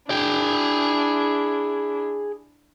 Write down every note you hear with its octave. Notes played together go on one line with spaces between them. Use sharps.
D4 E4 G#4 G5